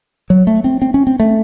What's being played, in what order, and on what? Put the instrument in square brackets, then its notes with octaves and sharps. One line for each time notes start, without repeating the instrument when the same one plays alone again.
[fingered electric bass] F#3
A3
C4
C4
C#4
C4
A3